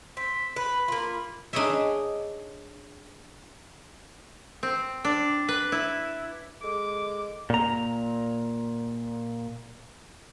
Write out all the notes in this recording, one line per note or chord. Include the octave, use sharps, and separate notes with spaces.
C4 B6
B4 B5
A#3 F4
D4 D#4 G#4 C#5 D#5 E5
C4
D4
B4
E4
G#3 A4 D6
A#2 A#5